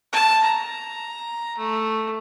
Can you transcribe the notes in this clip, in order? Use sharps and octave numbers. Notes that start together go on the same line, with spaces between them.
A5
A#5
A3